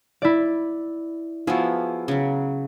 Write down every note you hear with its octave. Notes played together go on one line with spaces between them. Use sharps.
E4 D5
F3 B3 E4 F#4 G#4
C#3 F#3